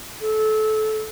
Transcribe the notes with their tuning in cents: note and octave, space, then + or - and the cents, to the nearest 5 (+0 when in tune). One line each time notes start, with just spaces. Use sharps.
A4 -25